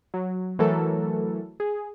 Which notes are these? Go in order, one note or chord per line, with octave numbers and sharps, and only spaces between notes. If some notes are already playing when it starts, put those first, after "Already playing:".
F#3
E3 F#3 A3 A4 A#4
G#4